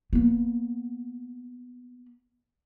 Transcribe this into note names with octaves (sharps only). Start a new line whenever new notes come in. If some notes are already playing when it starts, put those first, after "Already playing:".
A#3 B3